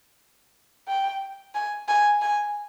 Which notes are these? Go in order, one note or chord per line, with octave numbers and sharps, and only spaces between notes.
G5
G#5
G#5
G#5